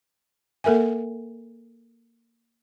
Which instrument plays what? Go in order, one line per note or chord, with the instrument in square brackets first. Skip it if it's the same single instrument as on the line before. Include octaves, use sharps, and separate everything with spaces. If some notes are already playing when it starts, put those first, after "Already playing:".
[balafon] A#3 A4 A#4 E5 G#5